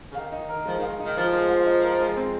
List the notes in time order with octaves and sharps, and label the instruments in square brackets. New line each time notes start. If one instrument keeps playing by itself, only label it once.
[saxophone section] C#3
[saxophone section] D#3 [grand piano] F5
[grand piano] D#4
A#4
[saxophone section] D#3
[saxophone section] F3 [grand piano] G#3
[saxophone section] D#3
[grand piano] F5
[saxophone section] D#3 [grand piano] D#4
[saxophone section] F3 [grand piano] A#4
[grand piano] G#3
F5
D#4
A#4
G#3
C4